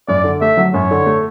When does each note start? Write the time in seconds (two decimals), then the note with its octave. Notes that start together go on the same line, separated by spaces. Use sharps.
0.08 F#2 D5
0.24 D3
0.41 A3 E5
0.57 F#3
0.74 F#2 C#5
0.91 D3
1.06 A3